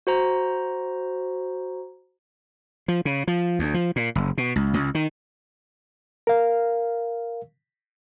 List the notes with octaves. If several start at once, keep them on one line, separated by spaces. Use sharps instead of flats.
F#4 C5 A#5
F3
C#3
F3
D2
F3
A#2
F#1
B2
C#2
C#2
D#3
A#4 F5